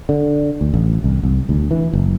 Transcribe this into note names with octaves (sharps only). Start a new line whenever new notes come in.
D3
D2
A1
C2
C2
D2
E3
F#1